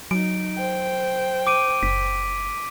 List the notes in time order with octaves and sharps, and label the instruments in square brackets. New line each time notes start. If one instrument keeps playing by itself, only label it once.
[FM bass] F#3 [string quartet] D#4 [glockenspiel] D7
[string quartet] C5 G5
[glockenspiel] D6 D7 D#7
[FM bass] F#1 [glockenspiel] B6